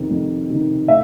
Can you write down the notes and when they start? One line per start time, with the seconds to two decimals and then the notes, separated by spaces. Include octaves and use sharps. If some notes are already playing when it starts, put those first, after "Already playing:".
Already playing: F2 C3 D#3
0.10 F2
0.49 C3 D#3
0.88 A2 E5